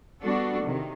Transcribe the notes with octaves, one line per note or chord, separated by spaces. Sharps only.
G3 B3 D4 F#4 A4
C3 D#3